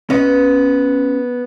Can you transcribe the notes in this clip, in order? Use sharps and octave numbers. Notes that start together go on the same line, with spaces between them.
B3 C#4 D#5